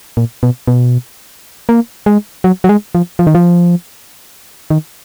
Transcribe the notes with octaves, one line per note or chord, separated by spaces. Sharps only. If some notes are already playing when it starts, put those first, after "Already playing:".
A#2
B2
B2
A#3
G#3
F#3
F#3
G#3
F3
F3
D#3
F3
D#3